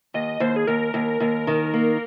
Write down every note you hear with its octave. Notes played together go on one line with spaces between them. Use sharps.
D#2 D#5
D#2 C5
G#4
D#2 A#4
D#2
D#2
D#3
A#3